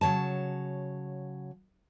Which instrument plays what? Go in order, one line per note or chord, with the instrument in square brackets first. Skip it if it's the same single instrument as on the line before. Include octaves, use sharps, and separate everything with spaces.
[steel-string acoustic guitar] C#3 F#3 C#5 A5